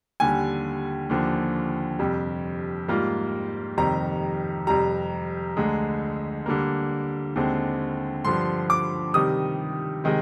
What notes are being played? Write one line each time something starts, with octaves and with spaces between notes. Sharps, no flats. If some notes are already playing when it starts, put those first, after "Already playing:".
D#2 D3 G3 G#5
D#2 D3 F3 A#3
F2 C3 G3
G#2 G3 A#3 F4
F2 C3 D#3 G3 A#5
F2 C3 G3 A#5
D2 D3 G#3
D3 G3 A#3
D#2 D3 G#3 C4
G2 D3 F3 C6
D6
C3 D#3 G3 D#6
C3 D#3 G#3